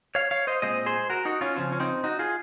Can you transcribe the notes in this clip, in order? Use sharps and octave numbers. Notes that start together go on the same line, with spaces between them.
C#5 F5
C#5 F5
C5 D#5
A#2 G#3 C4 C5 D#5
G#4 C5
F#4 A#4
D#4 F#4
C#4 F4
C#3 F3 C4 C#4
C#4
C4 D#4
D#4 F#4
F4 G#4